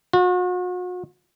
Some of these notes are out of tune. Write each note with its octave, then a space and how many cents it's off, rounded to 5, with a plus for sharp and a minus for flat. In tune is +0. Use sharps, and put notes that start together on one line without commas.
F#4 -40